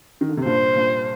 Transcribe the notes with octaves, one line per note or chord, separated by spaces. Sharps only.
D#3
D3
C3
G2 A#2 C5
G2 A#2